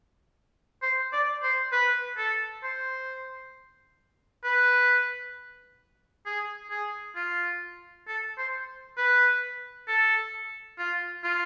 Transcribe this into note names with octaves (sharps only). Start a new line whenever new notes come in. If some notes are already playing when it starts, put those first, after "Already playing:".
C5
D5
C5
B4
A4
C5
B4
G#4
G#4
F4
A4
C5
B4
A4
F4
F4